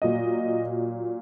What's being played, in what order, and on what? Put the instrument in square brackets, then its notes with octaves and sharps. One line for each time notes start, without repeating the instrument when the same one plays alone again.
[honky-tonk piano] A#2 F#3 D#5